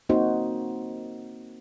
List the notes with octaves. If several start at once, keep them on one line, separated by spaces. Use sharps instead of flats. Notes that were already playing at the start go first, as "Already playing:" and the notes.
A#3 C4 D#4 F#4 C5